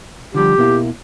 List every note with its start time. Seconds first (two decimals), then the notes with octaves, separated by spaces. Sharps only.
0.34 D3 F3 G3 G4
0.58 B2 A#3 E4